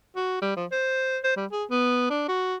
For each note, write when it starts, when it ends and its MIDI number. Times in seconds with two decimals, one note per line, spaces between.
0.16 0.41 66
0.42 0.54 55
0.57 0.66 53
0.72 1.18 72
1.24 1.35 72
1.37 1.46 55
1.52 1.64 68
1.70 2.08 59
2.10 2.24 62
2.28 2.56 66